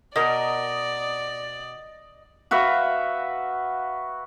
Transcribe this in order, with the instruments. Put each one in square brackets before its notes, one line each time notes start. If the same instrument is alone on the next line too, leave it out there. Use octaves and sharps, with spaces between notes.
[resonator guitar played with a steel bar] B2 A#4 [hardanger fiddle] D5 [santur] D#5
[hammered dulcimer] F#4 B4 E5 F5